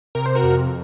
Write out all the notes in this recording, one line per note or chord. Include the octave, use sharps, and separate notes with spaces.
C3 A#4
C5
F#4 A#4
F2